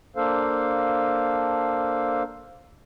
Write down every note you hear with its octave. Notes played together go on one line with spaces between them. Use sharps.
A#3 D4 A4 C5 F5